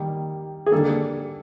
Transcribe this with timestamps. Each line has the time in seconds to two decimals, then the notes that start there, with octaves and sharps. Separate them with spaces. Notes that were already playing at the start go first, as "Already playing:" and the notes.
Already playing: D#3 G3 A#3
0.66 G#4
0.72 D3 G3 A#3 A4